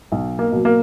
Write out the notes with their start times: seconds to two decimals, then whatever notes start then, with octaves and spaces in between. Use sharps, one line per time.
0.12 B1
0.39 A#3
0.52 B2 F#3
0.65 A#3